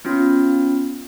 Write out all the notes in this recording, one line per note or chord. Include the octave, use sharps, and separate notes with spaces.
B3 C#4 F4